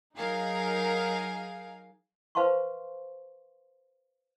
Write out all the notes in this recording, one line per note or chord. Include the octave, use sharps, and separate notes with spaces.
F#3 D#4 G#4 A#4 F5
B4 C5 F5 A5 C6 C#6